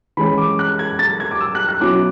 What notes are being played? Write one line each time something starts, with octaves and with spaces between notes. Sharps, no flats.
E3 G#3 C#4 B5
D6
F#6
G#6
A6
G#6
D6
E6
F#6
F#6
B2 F#3 C#4 E4 D6